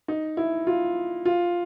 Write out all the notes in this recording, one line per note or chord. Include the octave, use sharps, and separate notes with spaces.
D#4
E4
F4
F4